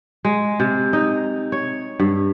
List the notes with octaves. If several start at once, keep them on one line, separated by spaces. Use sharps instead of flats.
G#3
C3
D#4
C#5
G2